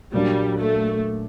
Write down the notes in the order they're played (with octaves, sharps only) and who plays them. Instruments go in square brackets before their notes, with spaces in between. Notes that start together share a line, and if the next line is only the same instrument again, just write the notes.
[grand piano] A#2 F#3 A#3 D4 [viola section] G3
[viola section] A3